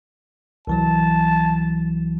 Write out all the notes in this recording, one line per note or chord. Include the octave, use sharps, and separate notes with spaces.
C2 E3 F#3 A5